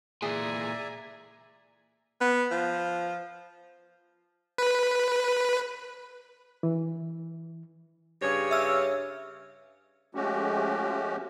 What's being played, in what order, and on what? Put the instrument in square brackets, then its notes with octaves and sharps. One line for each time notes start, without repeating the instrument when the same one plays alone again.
[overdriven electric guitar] A#2 E3 [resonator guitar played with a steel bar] G#4 [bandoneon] D5 E5 [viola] G#5 A#5
[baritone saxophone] B3
F3
[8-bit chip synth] B4
[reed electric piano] E3
[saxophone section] G2 C#3 C#5
[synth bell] E5 E6 F6
[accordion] F3 G#3 A3 C#4 F#4 G4